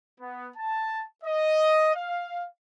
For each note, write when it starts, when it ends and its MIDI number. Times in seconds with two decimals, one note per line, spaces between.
0.20 0.47 59
0.57 1.03 81
1.24 1.94 75
1.95 2.45 77